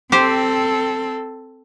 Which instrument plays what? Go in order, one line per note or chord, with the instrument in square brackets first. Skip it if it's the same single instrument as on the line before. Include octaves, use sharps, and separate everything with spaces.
[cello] C4 A4 [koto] G4 C5